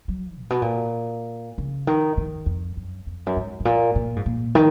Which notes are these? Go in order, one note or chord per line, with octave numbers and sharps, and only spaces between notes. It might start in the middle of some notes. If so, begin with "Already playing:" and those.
F#3
A#2
B2
A#2
C#3
D#3
D#3
F2
F#2
F2
F#2
G#2
G#2
A#2
A#2
G#2
A#2
D#3